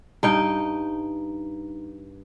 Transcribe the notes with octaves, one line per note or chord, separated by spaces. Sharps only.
G2 D#4 G5